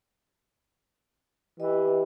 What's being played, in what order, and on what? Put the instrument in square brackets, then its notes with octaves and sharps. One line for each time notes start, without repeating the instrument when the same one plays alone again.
[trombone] E3 [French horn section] E4 G4 [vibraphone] D#5